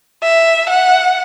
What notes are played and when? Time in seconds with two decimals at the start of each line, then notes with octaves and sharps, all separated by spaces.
0.23 E5
0.69 F#5